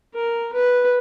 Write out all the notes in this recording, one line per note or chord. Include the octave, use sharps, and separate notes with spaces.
A#4
B4